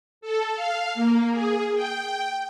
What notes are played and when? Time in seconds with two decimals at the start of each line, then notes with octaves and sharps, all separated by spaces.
0.21 A4
0.55 F5
0.94 A#3
1.30 G#4
1.74 G5